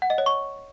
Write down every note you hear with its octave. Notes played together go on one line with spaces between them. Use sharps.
F#5
D#5
C#5
C#6